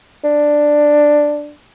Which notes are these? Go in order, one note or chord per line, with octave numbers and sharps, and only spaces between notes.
D4